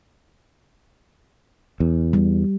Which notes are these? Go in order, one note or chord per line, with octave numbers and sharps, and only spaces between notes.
E2
G3